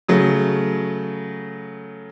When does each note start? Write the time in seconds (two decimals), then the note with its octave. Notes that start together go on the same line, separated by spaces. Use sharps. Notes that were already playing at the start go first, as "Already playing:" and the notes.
0.08 C#3 F#3 A3